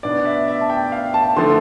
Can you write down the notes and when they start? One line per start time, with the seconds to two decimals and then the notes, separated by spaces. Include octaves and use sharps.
0.03 B2 B3 D4 D5
0.25 E5
0.48 E5
0.61 A5
0.70 G5
0.92 F5
1.14 A5
1.36 D3 F3 A3 C6